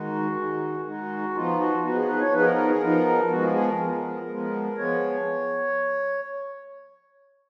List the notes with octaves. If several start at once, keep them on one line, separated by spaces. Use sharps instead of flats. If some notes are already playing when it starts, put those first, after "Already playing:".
Already playing: D#3 G#3 D#4 F#4
D#3 G#3 D#4
D#3 G#3 D#4 F#4
F3 B3 D#4 F4
F#4
F3 B3 D#4 F#4
G#4
B4
C#5
F3 B3 D#4 B4
G#4
A#4
A#4
G#4
F3 B3 D#4 A#4
F3 G#3 B3 F#4
G#4
G#4
A#4
F3 G#3 B3
F3 G#3 B3
F3 G#3 B3 C#5